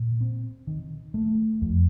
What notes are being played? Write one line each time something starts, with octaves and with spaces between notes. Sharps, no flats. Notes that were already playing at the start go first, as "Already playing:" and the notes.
Already playing: A#2
C4
D#3
A3
F2